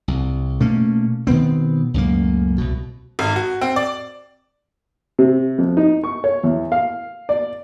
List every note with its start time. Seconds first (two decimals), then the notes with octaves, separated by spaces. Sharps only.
0.08 C2
0.60 B2 A3 A#3 C#4
1.27 B2 D#3 B3 C4
1.94 C#2 F#2 A2 A#3
2.58 C2 B2
3.19 G#1
3.36 F#4
3.61 C4
3.76 D5
5.19 C3
5.58 F2
5.77 D#4
6.04 C#6
6.24 C#5
6.43 E2
6.72 F5
7.29 D5